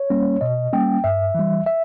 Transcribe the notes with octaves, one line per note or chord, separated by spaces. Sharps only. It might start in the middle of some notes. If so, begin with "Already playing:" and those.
Already playing: C#5
G3 A#3 C#4
B2 D#5
G3 A#3 C#4 G5
G2 E5
E3 G3
E5